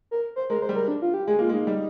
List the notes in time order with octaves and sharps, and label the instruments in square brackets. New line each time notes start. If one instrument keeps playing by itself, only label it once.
[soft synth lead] A#4
C5
[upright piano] G#3 [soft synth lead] A#4
[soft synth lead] C5
[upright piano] G3
[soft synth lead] A#4
D4
F4
G4
[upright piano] G#3 [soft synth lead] G#4
[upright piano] A#3 [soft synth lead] F4
[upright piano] G#3
[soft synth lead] D#4
[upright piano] G3 [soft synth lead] D#4